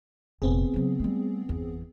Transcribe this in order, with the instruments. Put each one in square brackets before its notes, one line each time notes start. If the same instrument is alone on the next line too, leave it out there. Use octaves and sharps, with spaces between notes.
[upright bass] F1 A#1 [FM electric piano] B3 C4 G#4
[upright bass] C#3 F#3
G3 A3
G1 E2